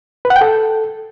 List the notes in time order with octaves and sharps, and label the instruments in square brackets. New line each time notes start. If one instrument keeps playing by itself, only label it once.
[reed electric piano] B4
F#5
G5
A4